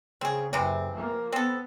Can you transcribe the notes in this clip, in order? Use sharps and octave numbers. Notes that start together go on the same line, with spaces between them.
C#3 C4 G#4
F#1 C3 E3 C4
F3 A#3
B3 C4 A4